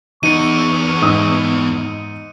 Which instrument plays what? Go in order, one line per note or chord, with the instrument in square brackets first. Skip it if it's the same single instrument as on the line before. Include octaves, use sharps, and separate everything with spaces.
[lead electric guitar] E2 B3 [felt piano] D#4 [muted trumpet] C#6 [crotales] C#7 D#7
[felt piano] G#2 D#6 E6
[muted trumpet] D#4